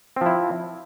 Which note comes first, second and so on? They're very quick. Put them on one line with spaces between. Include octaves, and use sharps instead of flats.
C4 F3 E4